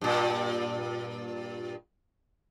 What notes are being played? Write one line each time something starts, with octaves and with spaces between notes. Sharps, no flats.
G2 A#2